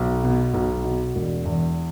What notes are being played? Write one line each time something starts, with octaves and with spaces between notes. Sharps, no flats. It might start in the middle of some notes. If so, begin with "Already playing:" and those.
Already playing: B1
B2
B1
B2
E1
E2